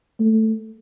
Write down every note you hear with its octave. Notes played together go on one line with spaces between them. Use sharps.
A3